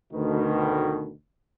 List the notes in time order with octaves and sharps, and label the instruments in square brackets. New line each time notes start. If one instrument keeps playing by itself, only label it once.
[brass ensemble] D2 B2 D#3